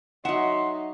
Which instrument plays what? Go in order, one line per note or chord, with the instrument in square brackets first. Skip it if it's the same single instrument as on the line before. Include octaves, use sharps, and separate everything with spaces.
[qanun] F#3 E5 [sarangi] D#4 [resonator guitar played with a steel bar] F#5 [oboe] C6